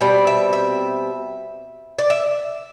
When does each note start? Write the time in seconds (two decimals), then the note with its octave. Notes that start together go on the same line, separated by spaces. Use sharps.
0.01 B2 G3 C4 D5
0.27 E5
0.53 E5
1.99 D5
2.10 E5